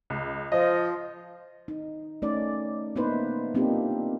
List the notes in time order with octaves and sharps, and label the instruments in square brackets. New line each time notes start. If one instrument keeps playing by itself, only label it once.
[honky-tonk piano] C#2
[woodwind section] F3 [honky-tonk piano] D#5
[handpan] D#4
A3 C#4 D#4 D5
A#3 B3 D#4 E4 B4 C5
A#3 C4 D4 D#4 F4 G4